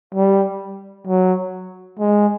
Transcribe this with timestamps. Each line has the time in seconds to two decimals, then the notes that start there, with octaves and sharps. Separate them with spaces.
0.14 G3
1.07 F#3
1.99 G#3